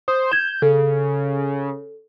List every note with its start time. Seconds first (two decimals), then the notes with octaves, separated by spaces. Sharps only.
0.08 C5 D#6
0.32 G6 G#6 E7
0.62 C#3 A4